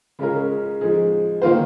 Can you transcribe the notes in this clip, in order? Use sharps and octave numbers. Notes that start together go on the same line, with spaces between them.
C#3 G#3 C#4 F4 A#4
F3 G#3 D#4 G#4
D#3 A#3 F4 C5